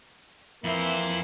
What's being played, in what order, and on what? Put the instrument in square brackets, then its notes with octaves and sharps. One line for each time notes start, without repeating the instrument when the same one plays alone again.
[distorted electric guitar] F2 C5 [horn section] E3 A#3 E4